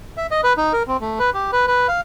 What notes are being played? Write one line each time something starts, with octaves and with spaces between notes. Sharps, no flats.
E5
D#5
B4
D#4
A#4
C4
A3
B4
G4
B4
B4
F5